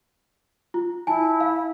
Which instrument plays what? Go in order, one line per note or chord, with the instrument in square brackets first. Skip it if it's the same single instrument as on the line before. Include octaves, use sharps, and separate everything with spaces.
[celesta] F4
[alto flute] E4 [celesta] G#5 A5
[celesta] F5